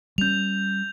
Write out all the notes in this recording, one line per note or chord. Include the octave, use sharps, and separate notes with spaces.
G3 C#4 G6 F7